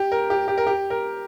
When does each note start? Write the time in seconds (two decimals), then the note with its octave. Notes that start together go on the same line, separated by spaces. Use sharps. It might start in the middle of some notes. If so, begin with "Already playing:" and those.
Already playing: G4
0.12 A#4
0.30 G4
0.48 G4
0.58 A#4
0.67 G4
0.90 A#4